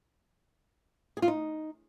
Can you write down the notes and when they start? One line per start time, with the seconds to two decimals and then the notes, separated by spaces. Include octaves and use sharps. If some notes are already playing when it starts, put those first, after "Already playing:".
1.17 G#4
1.22 F4
1.28 D#4